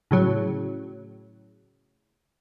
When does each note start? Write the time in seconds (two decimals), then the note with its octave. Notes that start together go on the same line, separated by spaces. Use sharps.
0.11 A2 C#3 F#3